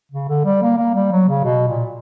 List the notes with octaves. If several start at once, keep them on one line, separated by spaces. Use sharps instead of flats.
C#3
D3
G3
A#3
A#3
G3
F#3
C#3
B2
A#2